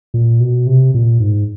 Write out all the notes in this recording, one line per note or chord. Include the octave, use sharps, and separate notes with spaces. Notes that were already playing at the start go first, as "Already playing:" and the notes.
A#2
B2
C3
A#2
G#2